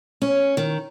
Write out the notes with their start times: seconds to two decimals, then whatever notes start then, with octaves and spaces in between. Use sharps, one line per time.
0.22 C#4
0.57 D#3